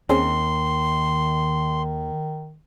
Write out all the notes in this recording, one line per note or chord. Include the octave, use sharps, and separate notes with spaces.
D#2 D#3 C4 C#4 G#4 C6